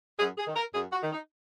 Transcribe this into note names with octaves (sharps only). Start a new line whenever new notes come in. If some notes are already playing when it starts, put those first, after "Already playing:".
F#2 G#4
G#4
D#3
A#4
F#2 G#4
F#4
D#3
D#4